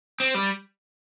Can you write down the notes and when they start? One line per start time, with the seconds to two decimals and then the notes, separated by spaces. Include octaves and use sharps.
0.20 C4
0.35 G3